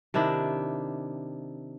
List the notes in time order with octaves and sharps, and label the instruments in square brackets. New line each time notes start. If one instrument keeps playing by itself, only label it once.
[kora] C3 D#3 D4 E4